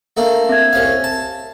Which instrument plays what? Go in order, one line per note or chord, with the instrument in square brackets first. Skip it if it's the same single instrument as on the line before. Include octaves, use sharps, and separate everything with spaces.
[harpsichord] A3 A#3 D4
[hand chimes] C4 E5 G#6
[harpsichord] C2 C#4 F5
A5